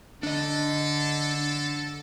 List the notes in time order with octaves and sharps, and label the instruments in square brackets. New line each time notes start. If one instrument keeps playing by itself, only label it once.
[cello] D3 [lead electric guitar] D4 D#5 [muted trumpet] A4